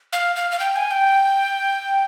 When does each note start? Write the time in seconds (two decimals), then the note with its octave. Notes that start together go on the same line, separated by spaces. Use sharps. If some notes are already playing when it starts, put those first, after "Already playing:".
0.13 F5
0.36 F5
0.51 F5
0.60 G5
0.76 G#5
0.91 G5